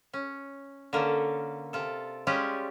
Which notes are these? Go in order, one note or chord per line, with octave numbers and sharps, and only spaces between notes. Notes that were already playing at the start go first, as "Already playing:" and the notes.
C#4
D3 A#3 C#4 A4
C3 F4 A4
G3 G#3 C#4 F4 G4 G#4